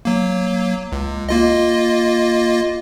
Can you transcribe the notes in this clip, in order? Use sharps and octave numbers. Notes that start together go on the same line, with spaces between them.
F#3 A#3
C#2
A#3 F4 D#5